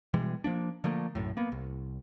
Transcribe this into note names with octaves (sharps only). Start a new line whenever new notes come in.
B2 E3 G3 G#3
F3 A#3 D4
D3 F3 A3 A#3
B1 F#2 A2
A#3 B3
C2